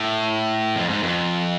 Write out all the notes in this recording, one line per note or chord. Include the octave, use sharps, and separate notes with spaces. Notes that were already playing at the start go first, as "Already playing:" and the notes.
Already playing: A2
F2
G#2
F2